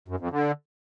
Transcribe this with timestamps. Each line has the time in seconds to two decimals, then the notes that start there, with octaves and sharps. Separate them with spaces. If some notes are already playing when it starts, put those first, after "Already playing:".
0.08 F#2
0.20 F2
0.31 D3